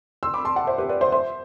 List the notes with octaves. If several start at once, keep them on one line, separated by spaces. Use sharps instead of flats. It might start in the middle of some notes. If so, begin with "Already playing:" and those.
C6 E6
B5 D6
A5 C6
F#5 A5
C5 E5
G4 B4
B4 D5
C5 E5
C5 E5